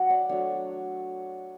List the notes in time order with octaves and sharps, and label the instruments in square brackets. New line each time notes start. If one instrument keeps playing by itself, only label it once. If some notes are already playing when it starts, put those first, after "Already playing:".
Already playing: [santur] F#3 D4 F#5
D5
F#3 A3 D4 C#5